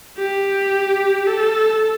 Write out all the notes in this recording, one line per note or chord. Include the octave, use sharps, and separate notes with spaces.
G4
A4